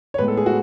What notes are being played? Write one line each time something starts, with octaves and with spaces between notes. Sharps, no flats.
C#5
A2 G#3 B3 B4
A4
G#4
F#4